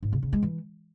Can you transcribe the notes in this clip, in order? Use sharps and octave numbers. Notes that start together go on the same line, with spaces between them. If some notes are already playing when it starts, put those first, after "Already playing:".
G#2
C#3
C#3
G#3
E3